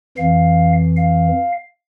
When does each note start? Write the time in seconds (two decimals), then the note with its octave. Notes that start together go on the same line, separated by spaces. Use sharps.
0.17 F2 E3 F5
0.97 F5